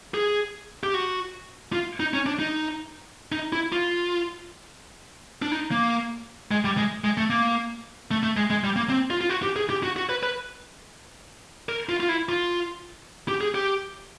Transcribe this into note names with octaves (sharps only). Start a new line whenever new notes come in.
G#4
G4
F#4
F4
D#4
C#4
D4
D#4
D#4
E4
F4
D4
D#4
A#3
G#3
G3
G#3
G#3
A3
A#3
A3
A3
G#3
G#3
G3
A#3
C4
F4
F4
F#4
G4
G#4
G4
F#4
F#4
B4
B4
A#4
F4
F4
E4
F4
G4
G#4
G4